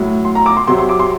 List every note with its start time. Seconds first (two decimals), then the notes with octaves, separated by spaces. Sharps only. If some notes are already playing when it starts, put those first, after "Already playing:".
Already playing: A2 F#3
0.25 C6
0.35 A#5
0.46 D6
0.57 C6
0.67 C3 F#3 C6
0.78 C6
0.89 D6
1.00 C6